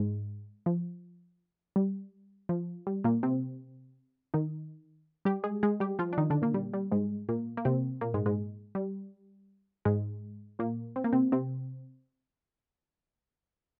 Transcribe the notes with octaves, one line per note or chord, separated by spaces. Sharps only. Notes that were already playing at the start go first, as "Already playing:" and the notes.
Already playing: G#2 G#3
F3
G3
F3
G3
A#2 A#3
C3 C4
D#3 D#4
G3 G4
G#3 G#4
G#3 G#4
G3 G4
F3 F4
D4
D#3 D#4
D3 D4
A#2 A#3
G3
G3
G#2 G#3
A#2 A#3
A#3
C3 C4
A#2 A#3
G#2 G#3
G#2 G#3
G3
G#2 G#3
A#2 A#3
C4
A#3
C3 C4
C3 C4